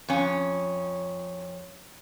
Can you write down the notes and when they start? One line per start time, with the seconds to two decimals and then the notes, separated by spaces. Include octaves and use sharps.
0.08 F2 C#4